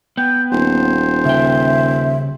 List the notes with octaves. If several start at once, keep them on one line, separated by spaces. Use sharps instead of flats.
B3 G5
D#1 C5
C#3 E5 G5